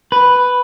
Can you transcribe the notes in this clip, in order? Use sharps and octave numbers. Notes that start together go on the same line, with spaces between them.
B4